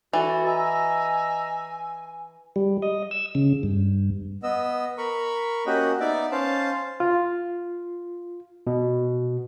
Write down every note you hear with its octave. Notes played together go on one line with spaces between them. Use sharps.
E3 F#4 A4
D#5 G#5 A#5 E6
G3
D#5
E6
C#3
G2
B3 D#5 E6
A#4 B5 C#6
A#3 C#4 F#4 G4 D#5 F#5
B3 D#4 D5 E5 D6
C#4 C5 F5 A5
F4
B2